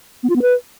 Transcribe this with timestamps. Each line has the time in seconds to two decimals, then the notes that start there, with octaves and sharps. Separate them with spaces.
0.23 B3
0.30 F4
0.36 B3
0.42 B4